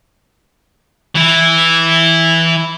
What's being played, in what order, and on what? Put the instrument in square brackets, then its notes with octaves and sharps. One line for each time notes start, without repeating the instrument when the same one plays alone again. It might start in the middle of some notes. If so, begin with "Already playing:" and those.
[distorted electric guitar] E3 E4